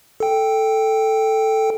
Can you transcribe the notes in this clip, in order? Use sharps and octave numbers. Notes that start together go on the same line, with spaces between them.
A4 G5